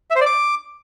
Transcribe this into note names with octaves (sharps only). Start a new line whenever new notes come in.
E5
C5
D5
D6